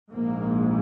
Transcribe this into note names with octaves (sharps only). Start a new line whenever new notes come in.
A#1 G#2 A#3